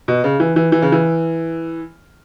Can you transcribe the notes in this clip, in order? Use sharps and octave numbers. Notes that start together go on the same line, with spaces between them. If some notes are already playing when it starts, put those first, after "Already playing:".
B2
C#3
E3
E3
E3
C#3
E3